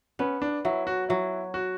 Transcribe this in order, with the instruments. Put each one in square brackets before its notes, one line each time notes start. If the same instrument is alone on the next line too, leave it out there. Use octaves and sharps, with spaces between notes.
[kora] B3 [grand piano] C#4
[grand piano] D4
[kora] F#3 [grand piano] E4
[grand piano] F#4
[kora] F#3 [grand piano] E4
[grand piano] F#4